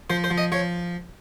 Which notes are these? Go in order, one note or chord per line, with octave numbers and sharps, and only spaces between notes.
F3 C5
C5
F3
D#5
F3 C#5